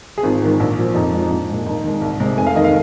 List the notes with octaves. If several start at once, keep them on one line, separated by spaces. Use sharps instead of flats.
G#4
G#1 F4
G#2 D#3 G#3
A#1
A#2 F3
F2 D#4
F3 G#3
D#4
A#1
A#2 G#3
D#2 D#4
D#3 G#3
C2
C3 G#3
F1 G#5
F5
D#2 D#3 G#3 D#5
F5